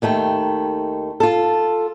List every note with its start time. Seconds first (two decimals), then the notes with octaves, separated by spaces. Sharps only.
0.02 D#2 D#3 A3 G5
1.20 F4 A4